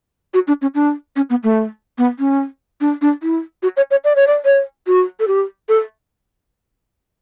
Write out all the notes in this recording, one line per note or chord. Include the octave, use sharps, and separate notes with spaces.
F#4
D4
C#4
D4
C#4
B3
A3
B3
C#4
D4
D4
E4
F#4
C#5
C#5
D5
C#5
D5
C#5
F#4
A4
G4
A4